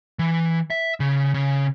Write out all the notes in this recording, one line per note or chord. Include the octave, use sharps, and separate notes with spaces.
E3
E5
C#3
C#3